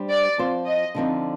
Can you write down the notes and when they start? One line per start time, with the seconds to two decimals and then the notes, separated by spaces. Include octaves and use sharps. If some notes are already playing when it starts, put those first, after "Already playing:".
Already playing: G3 D4 G4 C5
0.10 D5
0.38 F3 C4 F4 C5
0.66 D#5
0.95 D3 F3 C4 D#4